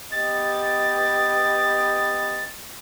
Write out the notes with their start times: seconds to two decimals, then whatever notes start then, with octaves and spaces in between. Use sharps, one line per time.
0.12 B3 G4 D#5 A6